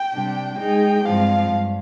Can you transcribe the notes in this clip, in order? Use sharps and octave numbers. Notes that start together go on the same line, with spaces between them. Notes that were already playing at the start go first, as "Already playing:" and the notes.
Already playing: G5
C3 G3 D4
G#3 D#4 G#4 G5
G2 F3 G#3 C4 F5
G2